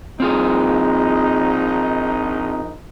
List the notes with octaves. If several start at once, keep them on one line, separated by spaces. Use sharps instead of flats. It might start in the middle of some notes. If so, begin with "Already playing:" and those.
A#1 C4 D#4 F4 G#4